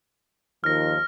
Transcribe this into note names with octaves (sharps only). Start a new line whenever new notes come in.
D#2 D#3 F3 F6 A#6